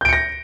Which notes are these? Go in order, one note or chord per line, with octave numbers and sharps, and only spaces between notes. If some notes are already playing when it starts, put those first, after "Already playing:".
G6 A#6 C#7 D7